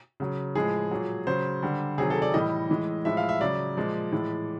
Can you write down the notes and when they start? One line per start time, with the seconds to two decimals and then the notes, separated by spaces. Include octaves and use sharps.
0.20 C#3 F#3
0.55 A2 F3 G#3 G#4
0.91 A#2 F#3
1.27 C#3 F#3 C5
1.63 D3 G3
1.98 C3 D#3 F#3 G#4
2.10 A4
2.22 D5
2.34 A2 E3 G3 D#5
2.70 A2 E3 G#3
3.05 A2 F3 G#3 E5
3.17 F5
3.29 E5
3.41 C#3 F#3 D5
3.77 A#2 F3 G#3
4.12 A2 E3 G#3